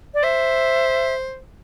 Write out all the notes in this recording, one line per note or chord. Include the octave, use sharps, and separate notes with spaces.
D5
C5 E5